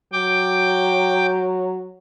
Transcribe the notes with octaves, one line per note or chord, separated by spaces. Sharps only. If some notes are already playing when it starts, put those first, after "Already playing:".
F#3 G5 D6